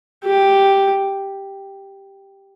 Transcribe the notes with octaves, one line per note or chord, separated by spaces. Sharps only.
G4